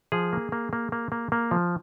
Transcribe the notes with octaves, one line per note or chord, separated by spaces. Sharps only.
F3 G#4
A#3
A#3
A#3
A#3
A#3
A#3
F3